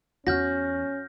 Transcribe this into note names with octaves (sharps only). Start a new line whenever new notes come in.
E2 C#4 F#4 F6 G6 A#6